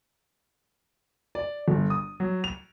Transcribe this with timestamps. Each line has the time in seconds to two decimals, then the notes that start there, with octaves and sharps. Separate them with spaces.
1.35 D5
1.68 G1
1.90 D#6
2.20 F#3
2.44 F7